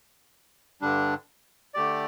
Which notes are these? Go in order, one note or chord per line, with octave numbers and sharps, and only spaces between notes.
G2 D3 G3 D4
D3 A3 G4 D5